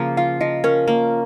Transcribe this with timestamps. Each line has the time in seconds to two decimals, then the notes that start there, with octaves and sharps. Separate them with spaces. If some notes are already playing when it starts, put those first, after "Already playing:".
Already playing: C#3 F3 A#3
0.17 F4 F5
0.41 F3 D#5
0.64 C#4 A#4
0.88 A#3